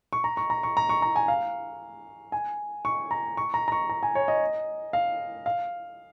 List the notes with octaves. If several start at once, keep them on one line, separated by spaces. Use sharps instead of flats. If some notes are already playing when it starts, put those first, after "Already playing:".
C#6
A#5
C#6
A#5
C#6
A#5
C#6
A#5
G#5
F5
G#5
C#6
A#5
C#6
A#5
A#5
C#6
A#5
G#5
C#5
D#5
F5
F5